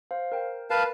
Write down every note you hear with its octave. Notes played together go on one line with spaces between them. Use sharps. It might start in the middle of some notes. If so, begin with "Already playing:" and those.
C5 F5
A#4 G5
A#4 B4 F5 A5